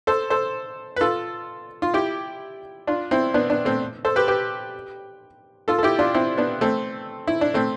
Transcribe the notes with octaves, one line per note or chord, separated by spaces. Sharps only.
A4 C5
A4 C5
B4
F4 A4
F4
E4 G4
D4 F4
C4 E4
B3 D4
B3 D4
A3 C4
A4 C5
G4 B4
G4 B4
F4 A4
A4
E4 G4
D4 F4
C4 E4
B3 D4
A3 C4
E4
D4
A3 C4